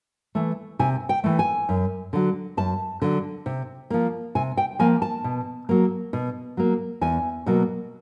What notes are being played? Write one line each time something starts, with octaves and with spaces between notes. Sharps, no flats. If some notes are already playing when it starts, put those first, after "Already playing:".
E3 A3
C3 G#5
G5
E3 A3
G#5
F#2
D3 F#3
F#2 A5
D3 F#3
C3
F3 A#3
C3 G#5
G5
F3 A#3 G#5
A5
B2
F#3 A#3
B2
F#3 A#3
E2 G#5
B2 F#3 A#3